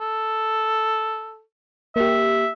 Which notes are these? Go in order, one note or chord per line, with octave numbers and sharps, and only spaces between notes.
A4
A#3 G4 E5